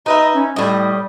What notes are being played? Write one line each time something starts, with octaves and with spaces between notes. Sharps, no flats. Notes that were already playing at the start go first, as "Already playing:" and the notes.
D#4 B4 D#5 E5
C#4
A2 G3 D#5